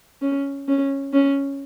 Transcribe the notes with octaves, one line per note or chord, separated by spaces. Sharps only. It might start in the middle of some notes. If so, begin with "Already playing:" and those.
C#4
C#4
C#4